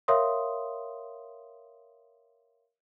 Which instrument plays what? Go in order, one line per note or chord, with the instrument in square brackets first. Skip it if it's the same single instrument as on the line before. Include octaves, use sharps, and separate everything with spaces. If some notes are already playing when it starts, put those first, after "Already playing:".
[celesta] A#4 C#5 E5 F5 C6 D#6